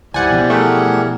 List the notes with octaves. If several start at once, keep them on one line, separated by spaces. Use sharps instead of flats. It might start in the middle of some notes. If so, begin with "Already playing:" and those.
C#2 G#2 E3 G3 C5 D5 F#5 G#5
B2 F3 B3
A3 G#4 A#4 F#5